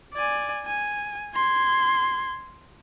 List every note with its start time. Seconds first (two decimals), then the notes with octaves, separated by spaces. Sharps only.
0.14 D5 G#5
0.66 G#5
1.35 C6 G#6